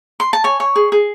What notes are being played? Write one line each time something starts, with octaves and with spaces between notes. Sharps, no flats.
C6
A5
C#5 G#5
C#5
G#4
G#4